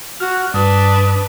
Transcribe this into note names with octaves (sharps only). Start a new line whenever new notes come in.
F#4 F6
G2 D4 B4 D#6